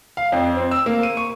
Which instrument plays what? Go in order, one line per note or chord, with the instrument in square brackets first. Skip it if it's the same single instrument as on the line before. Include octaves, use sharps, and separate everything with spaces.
[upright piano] F5
F2
C4
E6
A#3
D#7
C#6